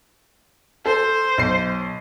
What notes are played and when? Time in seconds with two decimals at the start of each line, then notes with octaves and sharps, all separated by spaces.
0.86 A4 C5
1.38 B1 C7